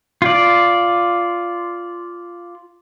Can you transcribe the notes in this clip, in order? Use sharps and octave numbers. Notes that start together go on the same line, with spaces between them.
F4 D5